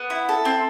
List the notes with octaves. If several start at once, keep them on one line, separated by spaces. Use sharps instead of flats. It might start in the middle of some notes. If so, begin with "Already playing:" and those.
Already playing: B3
E4
A4
C4